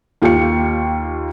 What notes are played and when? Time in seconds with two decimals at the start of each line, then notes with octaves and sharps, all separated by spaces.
0.22 D#2 F4 G4 G5 C#7